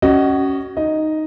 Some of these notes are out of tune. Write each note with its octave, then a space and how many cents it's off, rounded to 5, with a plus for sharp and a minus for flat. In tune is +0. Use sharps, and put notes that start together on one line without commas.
C#4 +0 F#4 +30 D#5 -20
D#4 +0 D#5 +0